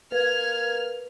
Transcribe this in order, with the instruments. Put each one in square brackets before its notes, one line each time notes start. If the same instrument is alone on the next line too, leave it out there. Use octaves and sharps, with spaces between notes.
[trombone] A#3 [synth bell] B4 [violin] F6 [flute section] G#6